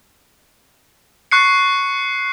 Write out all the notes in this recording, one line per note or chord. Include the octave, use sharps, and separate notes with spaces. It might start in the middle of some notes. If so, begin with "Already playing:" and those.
C#6 F#6 C7 C#7